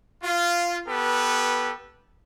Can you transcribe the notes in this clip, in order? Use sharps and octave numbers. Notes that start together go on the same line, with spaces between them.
F4
B3 G4 A4 B4